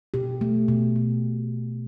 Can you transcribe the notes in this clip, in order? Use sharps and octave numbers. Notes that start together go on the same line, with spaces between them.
B2 G4
A3
B2
A3